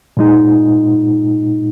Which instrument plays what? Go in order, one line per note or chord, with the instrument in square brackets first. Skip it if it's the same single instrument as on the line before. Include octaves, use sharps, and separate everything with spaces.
[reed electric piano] A#2 G#3 D#4